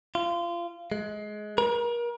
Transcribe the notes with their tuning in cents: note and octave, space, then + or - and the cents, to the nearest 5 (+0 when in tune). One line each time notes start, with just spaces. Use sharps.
F4 -25
G#3 +20
A#4 +35